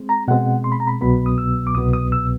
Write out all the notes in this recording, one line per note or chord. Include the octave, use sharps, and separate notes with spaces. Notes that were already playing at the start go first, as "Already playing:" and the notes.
Already playing: G#3 C4
A#5
B2 G#3 C4 F#5
C6
B5
A#5
B5
C2 B2 F#3 B3 B5
D#6
E6
D6
C2 B2 F#3 B3 D#6
D#6
E6